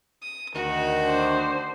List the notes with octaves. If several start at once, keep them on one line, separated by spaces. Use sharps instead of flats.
D#6
D2 D#3 F#4
D4 C5